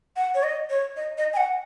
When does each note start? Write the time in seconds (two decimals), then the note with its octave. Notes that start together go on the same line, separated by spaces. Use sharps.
0.16 F#5
0.35 C#5
0.43 D#5
0.70 C#5
0.97 D#5
1.18 D#5
1.33 G#5
1.37 F#5